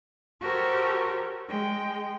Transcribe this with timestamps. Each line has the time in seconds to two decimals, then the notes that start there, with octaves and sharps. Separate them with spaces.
0.41 F#4 G4 A4 A#4 C5 C#5
1.47 G#3 G5